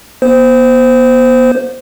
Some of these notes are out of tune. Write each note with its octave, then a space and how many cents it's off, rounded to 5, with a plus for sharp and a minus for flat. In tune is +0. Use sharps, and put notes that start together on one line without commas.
B3 -40 C5 -15